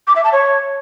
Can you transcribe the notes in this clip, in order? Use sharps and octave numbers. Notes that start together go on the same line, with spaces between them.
D6
E5
A5
C#5